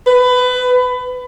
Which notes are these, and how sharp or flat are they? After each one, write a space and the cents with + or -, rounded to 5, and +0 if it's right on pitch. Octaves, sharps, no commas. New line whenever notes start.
B4 +20